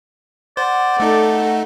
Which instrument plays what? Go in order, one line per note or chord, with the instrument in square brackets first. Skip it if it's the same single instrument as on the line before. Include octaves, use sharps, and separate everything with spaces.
[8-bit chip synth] C5 [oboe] D5 [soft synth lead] F#5
[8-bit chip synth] A3 D#4 [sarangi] A4